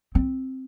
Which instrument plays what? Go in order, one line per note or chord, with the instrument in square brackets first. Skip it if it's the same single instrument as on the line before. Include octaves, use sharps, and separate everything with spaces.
[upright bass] C4